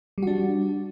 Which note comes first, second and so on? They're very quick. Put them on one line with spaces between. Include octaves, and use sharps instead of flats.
G3 F#4 D4